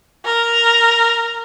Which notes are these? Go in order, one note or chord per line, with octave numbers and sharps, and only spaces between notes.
A#4